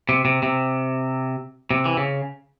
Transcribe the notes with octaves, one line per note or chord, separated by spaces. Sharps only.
C3
C3
C3
C3
E3
C#3